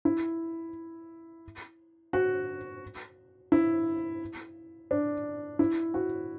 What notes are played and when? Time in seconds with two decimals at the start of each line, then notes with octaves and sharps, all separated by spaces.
0.05 E4
2.13 F#4
3.52 E4
4.91 D4
5.59 E4
5.94 F#4